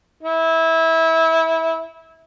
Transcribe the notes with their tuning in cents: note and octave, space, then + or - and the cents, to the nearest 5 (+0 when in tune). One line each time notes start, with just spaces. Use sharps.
E4 -20